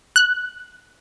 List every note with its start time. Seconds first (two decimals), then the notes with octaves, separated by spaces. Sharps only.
0.16 F#6